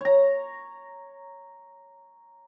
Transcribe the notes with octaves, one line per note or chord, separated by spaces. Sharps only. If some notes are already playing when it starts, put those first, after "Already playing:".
C#5 A#5